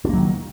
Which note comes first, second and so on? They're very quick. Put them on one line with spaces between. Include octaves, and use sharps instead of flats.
D4 A#3 F#3 D#3